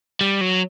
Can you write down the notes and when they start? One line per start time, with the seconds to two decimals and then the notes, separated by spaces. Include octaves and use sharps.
0.21 G3
0.41 F#3